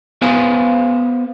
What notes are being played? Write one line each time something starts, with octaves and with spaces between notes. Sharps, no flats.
B3 B4 C5 F5 G#5